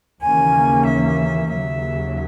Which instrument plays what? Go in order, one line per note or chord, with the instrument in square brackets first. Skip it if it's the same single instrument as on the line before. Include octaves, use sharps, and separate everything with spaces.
[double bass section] D#2 C#3 E3 A#3 C#4 [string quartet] G#5
[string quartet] E5
[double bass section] D#2 C#3 F#3 [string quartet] E5